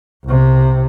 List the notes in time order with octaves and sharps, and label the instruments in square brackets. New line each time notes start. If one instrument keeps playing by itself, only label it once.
[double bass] C2 C3